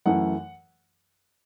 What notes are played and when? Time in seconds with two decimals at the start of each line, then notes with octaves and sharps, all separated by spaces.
0.06 F#2 E3 A3 F#5